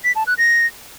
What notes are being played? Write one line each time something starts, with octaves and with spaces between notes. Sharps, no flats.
B6
A5
F#6
A#6